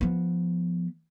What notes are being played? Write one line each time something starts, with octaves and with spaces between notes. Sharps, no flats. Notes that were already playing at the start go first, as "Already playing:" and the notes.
F3 B3